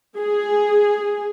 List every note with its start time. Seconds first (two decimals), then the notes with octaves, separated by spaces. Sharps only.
0.18 G#4